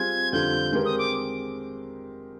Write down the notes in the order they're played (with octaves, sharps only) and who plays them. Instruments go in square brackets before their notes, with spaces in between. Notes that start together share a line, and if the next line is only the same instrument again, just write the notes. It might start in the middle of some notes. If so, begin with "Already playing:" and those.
Already playing: [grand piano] G3 C4 F4 G#4 [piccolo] G#6
[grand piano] F2 D3 G3 C4 F4 [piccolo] G6
[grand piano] D#3 G#3 C4 G4 A#4
[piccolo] D#6
D6